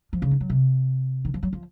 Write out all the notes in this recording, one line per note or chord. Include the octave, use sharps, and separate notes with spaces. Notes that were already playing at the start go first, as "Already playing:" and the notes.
F3
C#3
D#3
F#3
C3
D#3
F3
F#3
F3